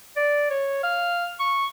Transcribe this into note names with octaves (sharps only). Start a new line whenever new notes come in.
D5
C#5
F5
C#6